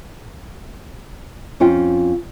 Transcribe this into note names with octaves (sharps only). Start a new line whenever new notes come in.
F2 C#4 F4 G5